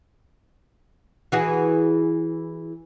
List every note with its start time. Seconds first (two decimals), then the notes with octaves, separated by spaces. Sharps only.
1.32 E3 F#4 G#4